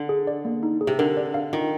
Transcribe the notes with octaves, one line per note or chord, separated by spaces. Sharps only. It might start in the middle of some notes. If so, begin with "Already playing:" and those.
Already playing: D3
G#4
D5
A#3
D#4
G#4
C3
D3 A#4
D5
F5
D#3 F4